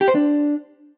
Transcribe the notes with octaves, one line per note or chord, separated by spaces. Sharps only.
G4
C5
D4